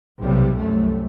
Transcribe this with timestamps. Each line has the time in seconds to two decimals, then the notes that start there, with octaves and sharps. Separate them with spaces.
0.19 B1 C3 G3
0.56 C2 F#2 A3